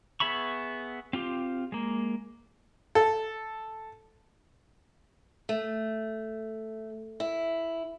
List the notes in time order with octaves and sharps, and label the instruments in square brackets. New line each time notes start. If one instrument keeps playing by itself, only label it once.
[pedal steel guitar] B3 G#4 E5 B5 C#6
C4 F4 G4
G#3 A#3
[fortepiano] A4
[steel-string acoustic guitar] A3
E4